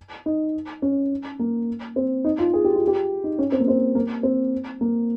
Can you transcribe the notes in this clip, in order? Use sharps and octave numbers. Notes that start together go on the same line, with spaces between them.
D#4
C#4
A#3
C4
D#4
F4
G#4
G4
F4
G4
D#4
C#4
C4
A#3
C4
A#3
C4
A#3